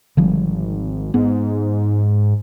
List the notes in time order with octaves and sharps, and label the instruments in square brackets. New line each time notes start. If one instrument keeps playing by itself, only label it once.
[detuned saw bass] G#1 [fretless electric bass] D3 F3 G3
[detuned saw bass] G#2 [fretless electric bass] B3